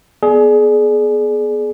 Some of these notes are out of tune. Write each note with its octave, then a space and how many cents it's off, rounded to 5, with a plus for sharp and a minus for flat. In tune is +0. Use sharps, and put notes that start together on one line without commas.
B3 +0 G#4 +25 D5 +10